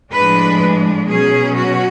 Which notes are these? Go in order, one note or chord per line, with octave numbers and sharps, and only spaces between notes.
A2 F3 G#3 D4 B4
B2 F#3 C#4 G#4
F#4